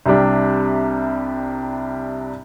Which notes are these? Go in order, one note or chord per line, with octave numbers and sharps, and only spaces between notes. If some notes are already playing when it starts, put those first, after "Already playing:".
C2 C3 G3 D4